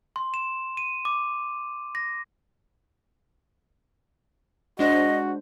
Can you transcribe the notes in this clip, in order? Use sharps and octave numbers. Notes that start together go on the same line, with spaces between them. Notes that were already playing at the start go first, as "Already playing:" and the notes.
C6
E7
D#7
D6
A#6
G#3 D4 F#4 C5 D#5